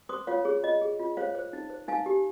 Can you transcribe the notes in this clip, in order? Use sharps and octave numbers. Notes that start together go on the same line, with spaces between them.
C5 C6 D#6
F4 C#5 F5
G#4 C#5
F4 D#5
G#4
F4
C5 C#5 F5
C5
D#4
C5
D#4 F5 G#5
G4